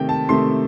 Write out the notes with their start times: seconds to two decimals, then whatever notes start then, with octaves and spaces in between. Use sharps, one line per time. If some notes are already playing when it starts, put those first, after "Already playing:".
Already playing: C3 D#3 A3 G5
0.09 A5
0.29 C3 D#3 A3 C6